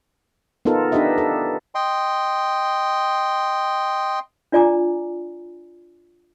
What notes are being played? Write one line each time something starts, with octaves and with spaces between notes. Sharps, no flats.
B3 D#4 F4 A4 A#4
D4 D#4 G4 B4 D#5 E5
A4
D#5 G5 C6
D4 F4 D5 G#5 A#5 D6